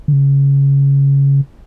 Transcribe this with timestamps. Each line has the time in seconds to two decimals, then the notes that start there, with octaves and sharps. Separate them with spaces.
0.08 D3
0.13 C#3